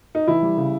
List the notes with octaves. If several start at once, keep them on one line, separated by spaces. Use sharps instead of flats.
D#4
E3 E4
G3
C#3